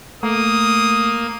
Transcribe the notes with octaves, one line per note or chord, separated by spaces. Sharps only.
A3 A#3 D#6